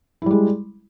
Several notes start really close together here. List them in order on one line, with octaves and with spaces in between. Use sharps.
E4 G3 G#3